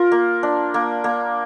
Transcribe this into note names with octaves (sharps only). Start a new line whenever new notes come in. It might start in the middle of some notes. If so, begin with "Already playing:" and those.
Already playing: F4 A#4
A#3
D4
A#3
A#3